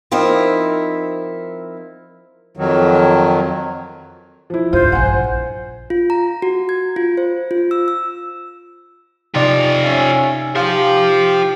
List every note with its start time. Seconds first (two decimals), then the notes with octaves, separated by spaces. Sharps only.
0.11 F3 C4 D#4 E4 A#4
2.57 F2 D#3 F#3
4.50 F3 E4
4.73 C#2 G2 F4 C5
4.92 A#1 G2 F#5 G#5
5.90 F4
6.10 A#5
6.42 F#4
6.69 G#6
6.96 F4
7.17 C5
7.51 F4
7.71 E6
7.88 E6
9.35 C3 D#4 F4 G4 D5
9.84 C#4 E5 G#5
10.56 F4 G4 C5 F5